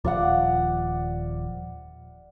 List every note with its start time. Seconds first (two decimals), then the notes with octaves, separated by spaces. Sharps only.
0.05 D#1 F3 D5 F5 F#5